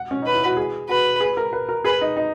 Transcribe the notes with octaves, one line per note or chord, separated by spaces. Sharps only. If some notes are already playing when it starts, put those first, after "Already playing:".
Already playing: F#5
C#4
D#4 B4
E4
F#4
G#4
F#4 B4
G#4
A#4
B4
A#4
G#4 B4
D#4
D#4